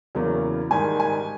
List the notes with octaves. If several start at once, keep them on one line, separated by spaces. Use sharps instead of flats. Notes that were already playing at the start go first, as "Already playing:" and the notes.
E2 C#3 F#3 A#3 C#4
G#2 D#3 G3 G#5
G#5